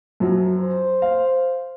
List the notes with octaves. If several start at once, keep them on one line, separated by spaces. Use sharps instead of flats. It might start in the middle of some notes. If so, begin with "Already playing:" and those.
F#2 F3 F#3
C5
F5